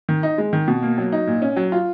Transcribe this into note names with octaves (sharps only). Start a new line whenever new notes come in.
D#3
D#4
G#3
D#3
B2
A#3
F#3
D#4
A#2
C#4
F#3
F4